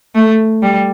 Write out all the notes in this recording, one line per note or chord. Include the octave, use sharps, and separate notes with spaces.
A3
G3